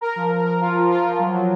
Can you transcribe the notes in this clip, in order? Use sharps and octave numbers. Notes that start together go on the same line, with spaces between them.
A#4
F3
A#4
A#4
F4
F3
F4
F3
F#3
F#3